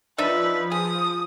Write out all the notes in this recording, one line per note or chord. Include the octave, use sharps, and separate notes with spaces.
F3 D4 D#4 B4 E5
G#4 D#6